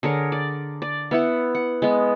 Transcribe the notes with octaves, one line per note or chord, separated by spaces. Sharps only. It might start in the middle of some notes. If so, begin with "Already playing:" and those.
D3 G#4 A#4 C#5
D5
D5
B3 E4 F#5
F#5
G#3 B3